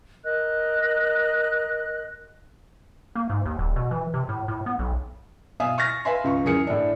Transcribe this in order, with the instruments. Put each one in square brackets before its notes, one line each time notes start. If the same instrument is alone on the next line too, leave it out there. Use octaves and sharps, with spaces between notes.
[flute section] A#4 D#5 F#6
[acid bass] A#3
G#2
D#2
D1
B2
E3
C3
A2
A2
B3
B1
[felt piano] B2 E5 F5 G#5 D#6
C#6 F6 A6 A#6
B4 E5 F5 G#5 C6
C#2 F5 C#6
F#2 E3 G#4 A#4 C#7
A2 D4